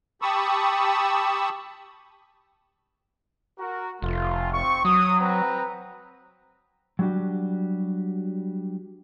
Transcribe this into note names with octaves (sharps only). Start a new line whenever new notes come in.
G4 A5 B5 C#6 D#6 E6
F#4 A#4
F1 A3 F4
C4 C#6
F#3 D#6
C4 B4 A#5
F#3 G3 D4 F#4 G4